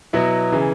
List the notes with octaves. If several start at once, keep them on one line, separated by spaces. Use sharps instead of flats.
B2 F#3 B3 E4
C#3 E3